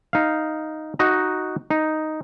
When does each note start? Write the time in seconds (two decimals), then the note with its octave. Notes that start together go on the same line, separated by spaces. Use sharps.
0.13 D#4 F5
0.99 D#4 F#4 D#5 A#5
1.70 D#4